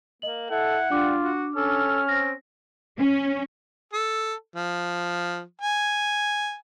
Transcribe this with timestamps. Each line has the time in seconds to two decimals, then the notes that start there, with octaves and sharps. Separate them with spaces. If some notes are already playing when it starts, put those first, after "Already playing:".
0.22 A#3 D#5 F#7
0.50 E4 A4 F#5
0.90 G3 D4 F4 D6
1.22 F#4
1.56 C#4 A4 F6
2.09 C4 A#6
2.99 C#4
3.93 A4
4.56 F3
5.61 G#5